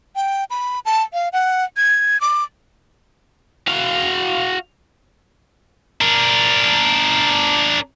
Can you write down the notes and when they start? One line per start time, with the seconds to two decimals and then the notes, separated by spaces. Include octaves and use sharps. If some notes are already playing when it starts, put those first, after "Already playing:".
0.16 G5
0.50 B5
0.85 A5
1.13 F5
1.33 F#5
1.77 G#6
2.21 D6
3.67 F#4 F5
6.01 D4 A#4